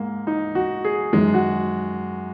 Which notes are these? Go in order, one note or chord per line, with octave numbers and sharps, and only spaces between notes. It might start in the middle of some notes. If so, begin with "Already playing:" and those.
Already playing: G#2 G#3 A#3
D#4
F#4
G#4
F#2 D#3 G#3
F#4